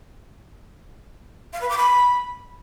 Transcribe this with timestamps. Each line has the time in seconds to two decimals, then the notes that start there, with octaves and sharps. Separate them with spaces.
1.53 F5
1.61 B4
1.69 D6
1.77 B5